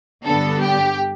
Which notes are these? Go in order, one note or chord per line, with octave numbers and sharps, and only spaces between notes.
G2 D3 B3 D4 A4
G4